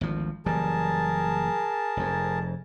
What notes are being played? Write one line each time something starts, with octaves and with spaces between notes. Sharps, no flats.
G#1 D2 F3
F#1 E3 G3 G#4 A#4 A5
F1 F2